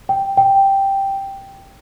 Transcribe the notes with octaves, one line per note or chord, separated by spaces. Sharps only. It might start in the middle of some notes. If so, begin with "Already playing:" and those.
G5
G5